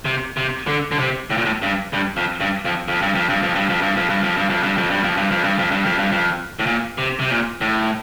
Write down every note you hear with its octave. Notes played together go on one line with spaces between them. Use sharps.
C3
C3
D3
D3
C3
A2
A#2
A2
G2
G2
F2
G2
F2
F2
G2
F2
G2
F2
G2
F2
G2
F2
G2
F2
G2
F2
G2
F2
G2
F2
G2
F2
G2
F2
G2
F2
G2
F2
A2
A#2
C3
C3
A#2
A2